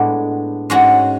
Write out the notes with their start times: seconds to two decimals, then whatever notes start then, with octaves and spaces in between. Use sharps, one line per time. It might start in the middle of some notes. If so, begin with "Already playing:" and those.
Already playing: A2 G#3 B3 D4
0.70 G#2 G#3 C#4 F#4